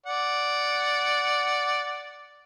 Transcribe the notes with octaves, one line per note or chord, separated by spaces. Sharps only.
D5 F#5